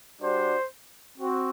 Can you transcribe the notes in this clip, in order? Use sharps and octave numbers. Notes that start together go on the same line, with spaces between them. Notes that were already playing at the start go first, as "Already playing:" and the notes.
G3 D4 F#4 C5
C4 F#4